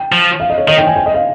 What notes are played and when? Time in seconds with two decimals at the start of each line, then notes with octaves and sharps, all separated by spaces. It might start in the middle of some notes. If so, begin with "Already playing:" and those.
Already playing: G5
0.12 F3
0.40 F5
0.50 D#5
0.58 C#5
0.68 D#3 D#5
0.78 G5
0.87 G#5
0.96 G5
1.06 D#5
1.15 F5